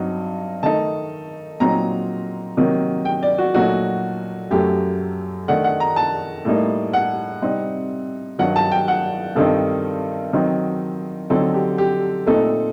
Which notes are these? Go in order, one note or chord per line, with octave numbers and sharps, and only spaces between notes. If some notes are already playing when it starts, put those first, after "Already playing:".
Already playing: G2 F#3 C4 D#4
D#3 A3 D#4 A5
A#2 F#3 C4 D#4 A#5
C3 D#3 F#3 A#3
G5
D5
F#4
A#2 F#3 A3 D#4 F#4
F#2 F#3 A3 G4
D#3 A3 D4 F#5
F#5
A#5
A5
A2 G3 A#3 D#4
F#5
C3 G3 C4 D#4
G2 D#3 F#3 F#5
A5
G5
F#5
G2 D#3 G3 C4 D#4 A4
D#3 F#3 C4 D#4
D3 F#3 C4 D#4 A4
G4
G4
A#2 A3 C4 D#4 A4